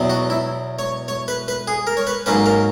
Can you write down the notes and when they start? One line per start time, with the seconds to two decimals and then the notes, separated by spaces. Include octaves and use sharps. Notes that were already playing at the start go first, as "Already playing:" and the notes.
Already playing: E2 B2 F#3
0.10 F#4
0.30 E4
0.79 C#5
1.08 C#5
1.28 B4
1.48 B4
1.67 G#4
1.87 A#4
1.97 C#5
2.07 B4
2.26 G#2 F#3 A#3 C#4 B4
2.46 A#4